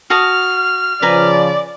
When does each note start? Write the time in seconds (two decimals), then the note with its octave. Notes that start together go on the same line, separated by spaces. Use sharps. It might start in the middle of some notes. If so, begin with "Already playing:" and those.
0.10 F#4 A5 D#6 F6
1.02 C#3 F3 B4 D5 G#5 A#5